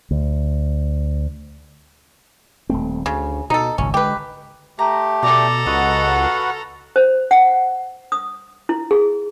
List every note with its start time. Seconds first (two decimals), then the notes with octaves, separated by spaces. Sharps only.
0.11 D2
2.69 D#1 A3 C4
3.06 D2 C#3
3.50 B2 D#4 A4
3.78 G#1 C#2 A#2 C#4
3.94 D3 G#3 G4 B4
4.79 A3 G4 A#5
5.23 B2 A4 D5 A#5
5.66 C#2 F#4 B4 D#5 F#5
6.23 F5
6.96 C5
7.31 F#5
8.12 D#6
8.69 E4
8.91 G#4